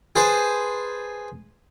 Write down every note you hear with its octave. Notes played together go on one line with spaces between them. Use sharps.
G#4 B4 C5 G#5 A5